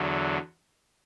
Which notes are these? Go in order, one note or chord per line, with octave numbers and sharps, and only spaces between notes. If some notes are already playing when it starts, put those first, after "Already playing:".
Already playing: E2 D3 F#3